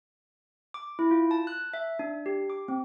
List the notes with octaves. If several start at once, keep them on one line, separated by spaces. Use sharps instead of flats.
D6
E4
F4
A5
F#6
E5
D4
G4
D6
C4